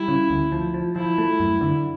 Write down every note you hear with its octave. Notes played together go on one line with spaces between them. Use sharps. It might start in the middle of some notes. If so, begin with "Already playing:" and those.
Already playing: G3 E4
C#3
D2
F3
F3
F3 E4
A3
F#2
D3